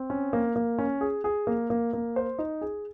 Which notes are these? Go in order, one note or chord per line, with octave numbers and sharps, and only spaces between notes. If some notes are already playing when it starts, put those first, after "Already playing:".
Already playing: C4
C#4
A#3
A#3
C#4
G#4
G#4
A#3
A#3
A#3
C5
D#4
G#4